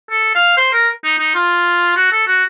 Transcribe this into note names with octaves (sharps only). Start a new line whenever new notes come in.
A4
F5
C5
A#4
D#4
D#4
F4
F#4
A4
F#4